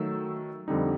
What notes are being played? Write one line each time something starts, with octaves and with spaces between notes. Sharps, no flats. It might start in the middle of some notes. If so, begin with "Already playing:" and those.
Already playing: D#3 F#3 A3 E6
F2 D3 G3 C4 D#4